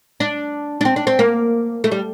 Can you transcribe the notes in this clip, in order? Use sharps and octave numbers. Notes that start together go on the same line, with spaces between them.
D4
D4
C4
D4
C4
A#3
A3
G3